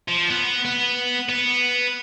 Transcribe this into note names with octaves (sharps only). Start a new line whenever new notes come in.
F3
B3
B3
B3